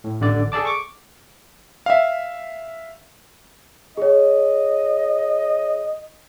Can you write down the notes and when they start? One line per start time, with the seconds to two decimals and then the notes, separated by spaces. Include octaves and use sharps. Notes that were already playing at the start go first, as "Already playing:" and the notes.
0.04 A2
0.20 A1 D3 D5
0.52 G#4 A4 D5 A5 D6
0.65 C#6 D6
1.86 E5 F5
3.97 G#4 C#5 D#5